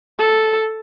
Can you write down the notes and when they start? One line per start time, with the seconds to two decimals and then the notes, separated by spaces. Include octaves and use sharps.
0.19 A4